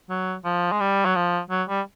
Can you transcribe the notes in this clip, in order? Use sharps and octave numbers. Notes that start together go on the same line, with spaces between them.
F#3
F3
G#3
G3
F#3
F3
F#3
G3